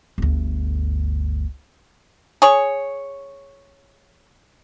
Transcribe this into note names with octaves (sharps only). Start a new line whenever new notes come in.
G1 D2
G#4 C#5